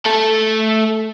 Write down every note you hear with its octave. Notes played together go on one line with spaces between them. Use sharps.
A3 A4